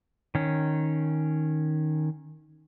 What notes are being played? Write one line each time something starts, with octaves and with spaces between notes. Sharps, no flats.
D#3 C#4